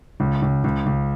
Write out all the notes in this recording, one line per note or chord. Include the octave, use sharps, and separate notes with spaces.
C#2
C#2
C#2
C#2